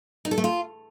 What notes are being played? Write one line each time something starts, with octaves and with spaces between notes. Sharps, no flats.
D#4
A4
A3
F4